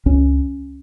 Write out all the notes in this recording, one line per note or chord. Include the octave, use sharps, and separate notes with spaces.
C#2 C#4